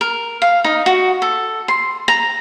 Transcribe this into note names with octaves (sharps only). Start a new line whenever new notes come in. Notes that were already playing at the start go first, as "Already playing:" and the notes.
A#4
F5
D#4
F#4
A4
C6
A#5